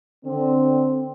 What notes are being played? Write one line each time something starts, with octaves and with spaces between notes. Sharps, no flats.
D3 C4